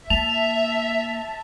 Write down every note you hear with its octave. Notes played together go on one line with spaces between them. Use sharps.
A#3 E5 A5 F7